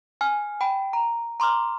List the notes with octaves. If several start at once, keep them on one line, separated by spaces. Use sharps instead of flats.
G#5 F6
G5 B5 D7
A#5
A#5 C6 D6 F6